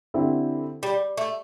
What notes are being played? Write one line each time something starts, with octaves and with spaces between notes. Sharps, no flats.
D3 C4 E4 G4
G3
A3